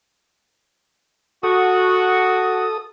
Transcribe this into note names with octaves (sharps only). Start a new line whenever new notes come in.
F#4 A4 D#6